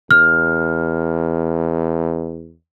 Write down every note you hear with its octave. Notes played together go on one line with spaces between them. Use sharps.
E2 F6